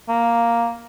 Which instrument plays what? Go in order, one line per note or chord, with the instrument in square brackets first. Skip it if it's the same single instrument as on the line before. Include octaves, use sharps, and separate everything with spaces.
[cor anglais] A#3